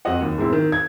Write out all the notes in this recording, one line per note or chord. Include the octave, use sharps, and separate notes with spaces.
F2 F#4 D#5 F#5
D#2
G#2 B2 C4 E4
D#3
G#6